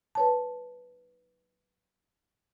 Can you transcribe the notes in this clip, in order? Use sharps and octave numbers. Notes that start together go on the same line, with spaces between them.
B4 C#5 A5